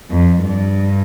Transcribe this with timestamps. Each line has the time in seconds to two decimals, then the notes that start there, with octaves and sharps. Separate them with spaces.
0.11 F2
0.44 G2